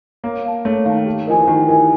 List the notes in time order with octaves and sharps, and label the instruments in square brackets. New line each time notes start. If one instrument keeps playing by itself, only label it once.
[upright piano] A#3 [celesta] C#5
[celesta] F5 A5
[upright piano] A3 [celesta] C#5
[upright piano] D#3 [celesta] F5 A5
[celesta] G4
[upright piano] F3 [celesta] A#4 D#5 G#5
[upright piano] E3
[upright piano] D#3 [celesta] G4
[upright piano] E3 [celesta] A#4 D#5 G#5